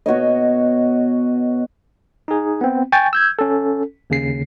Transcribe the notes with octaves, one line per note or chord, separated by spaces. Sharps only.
B2 F#4 C#5 D#5
D#4 G#4
B3 C4
G5 G#5 C#6 G6 A6
E6 G6 G#6
C#4 A4
D#2 C#3 C7